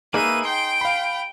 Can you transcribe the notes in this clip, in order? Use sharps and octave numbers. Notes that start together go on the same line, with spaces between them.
A#3 D#4 G#4 B4 E5 D#7
G5 C6
F5 B5